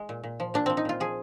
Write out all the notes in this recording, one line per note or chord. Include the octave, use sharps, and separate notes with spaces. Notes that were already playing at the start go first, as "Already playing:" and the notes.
Already playing: G#3
A#2
A#2
F3
A#2 D4
F3 C4
D#4
A#2 F4
F3 G#4